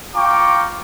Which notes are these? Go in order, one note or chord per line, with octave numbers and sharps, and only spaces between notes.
F4 G5 A#5 C#6 D6